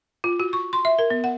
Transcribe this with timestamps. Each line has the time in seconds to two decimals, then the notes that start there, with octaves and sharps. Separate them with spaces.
0.24 F4
0.40 F#4
0.53 C#6
0.73 C6
0.85 E5
0.99 A#4
1.10 B3
1.24 F#5